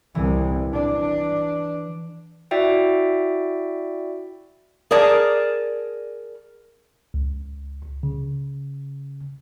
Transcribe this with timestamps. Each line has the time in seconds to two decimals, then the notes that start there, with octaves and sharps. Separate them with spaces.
0.15 C2 E3
0.73 D4
2.51 E4 F#4 D5 E5 G5
4.91 G#4 A#4 D5 A5
7.14 C#2
8.03 C#3